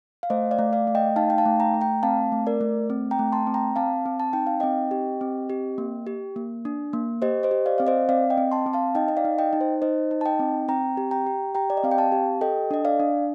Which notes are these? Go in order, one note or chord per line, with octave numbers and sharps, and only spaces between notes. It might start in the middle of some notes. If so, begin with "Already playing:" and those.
F5
A3 C5 D#5
D5 F5
A3
D5 F5
A3
D#5 G5
D#4 F5 A5
G5
F5 A5
A3
G5 A#5
A3
G5 A#5
C4 F5 A5
A3
A#4 D5
A3
C4
G5 A#5
A3
A5 C6
C4
G5 A#5
C4 F5 A5
C4
A5
D#4 G5
F5
C4 D#5 G5
G4
C4
G4
A#3
G4
A#3
D4
A#3
G4 C5 D#5
C5 D#5
G4
D5 F5
C4 F5
C5 D#5
C4 D5 F5
D#5 G5
C4
A5 C6
C4
F5 A5
D#4 D#5 G5
D#5
D5 F5
D#4
D#5 G5
D#4
C5
D#4 C5 D#5
D#4
A5
D#5 G5
C4
C4 G5 A#5
G4
G5 A#5
G4
G4 G5 A#5
D5
D#5
C4 F5
G5
F5 A5
G4
A4 D#5 G5
D4 D#5
D5 F5
D4